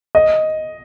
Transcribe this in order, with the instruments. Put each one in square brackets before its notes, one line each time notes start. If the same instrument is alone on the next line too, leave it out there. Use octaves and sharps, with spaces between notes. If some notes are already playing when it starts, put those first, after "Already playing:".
[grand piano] D#5